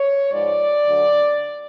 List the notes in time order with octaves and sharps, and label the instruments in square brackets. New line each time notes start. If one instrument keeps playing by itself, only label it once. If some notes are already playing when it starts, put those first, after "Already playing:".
Already playing: [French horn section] C#5
G#2 F3 G#3 D5
D2 D3 F#3